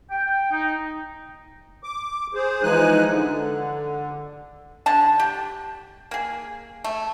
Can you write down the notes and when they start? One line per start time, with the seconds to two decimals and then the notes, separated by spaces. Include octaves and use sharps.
0.10 G5
0.51 D#4
1.84 D6
2.34 G#4 C5
2.63 E3 F3 G#3 D#4 G#5 F#6
3.09 D3
4.86 D3 F#5 A5
5.20 G4
6.11 A#3 G#4
6.84 A3